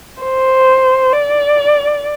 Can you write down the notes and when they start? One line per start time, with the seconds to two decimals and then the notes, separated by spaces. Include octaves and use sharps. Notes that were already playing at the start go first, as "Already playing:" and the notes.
0.23 C5
1.13 D5